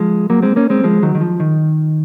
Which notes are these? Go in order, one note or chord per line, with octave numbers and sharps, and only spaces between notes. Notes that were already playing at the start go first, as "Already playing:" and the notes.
Already playing: F3 G#3
F#3 A#3
G#3 C4
A#3 C#4
G#3 C4
F3 G#3
D#3 F#3
D#3
F3
D#3